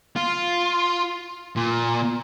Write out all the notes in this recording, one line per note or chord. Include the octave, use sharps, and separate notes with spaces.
F4
A#2